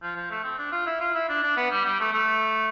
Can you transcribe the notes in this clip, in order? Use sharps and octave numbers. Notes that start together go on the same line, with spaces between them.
F3
F3
A3
C4
D4
F4
E4
F4
E4
D4
D4
B3
G3
G3
A3
A3